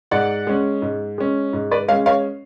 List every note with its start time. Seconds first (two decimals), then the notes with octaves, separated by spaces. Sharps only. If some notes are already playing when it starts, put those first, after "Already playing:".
0.11 G#2 D5 F#5
0.47 G#3 C#4
0.82 G#2
1.18 G#3 C#4
1.53 G#2
1.71 B4 D5
1.88 G#3 C#5 F5
1.92 C#4
2.06 C#5 F5